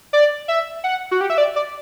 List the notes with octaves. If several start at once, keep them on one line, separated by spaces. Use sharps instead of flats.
D5
E5
F#5
F#4
G4
E5
D5
D5